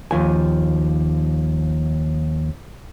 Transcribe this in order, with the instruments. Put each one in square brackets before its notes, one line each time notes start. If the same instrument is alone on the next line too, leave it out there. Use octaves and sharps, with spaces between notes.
[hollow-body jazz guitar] D#2 F3 G#5